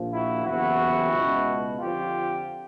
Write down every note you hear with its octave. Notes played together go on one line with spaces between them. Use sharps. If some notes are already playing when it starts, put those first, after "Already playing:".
Already playing: A#1 A#2 F3
E4 F#4
F#1 E2 C3 E3 E4 F#4
C#2 B2
F2 D3 F3 F4 G4